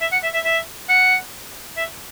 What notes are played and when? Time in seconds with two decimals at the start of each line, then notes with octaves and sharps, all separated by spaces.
0.01 E5
0.12 F#5
0.23 E5
0.34 E5
0.44 E5
0.89 F#5
1.77 E5